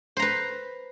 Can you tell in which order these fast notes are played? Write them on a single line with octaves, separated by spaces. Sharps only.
C5 A#5 B4